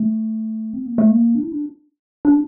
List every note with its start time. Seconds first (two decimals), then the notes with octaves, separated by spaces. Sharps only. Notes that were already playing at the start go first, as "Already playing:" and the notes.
Already playing: A3
0.73 C4
0.86 A#3
0.98 A3
1.11 A#3
1.35 D4
1.43 E4
1.52 D4
2.25 D4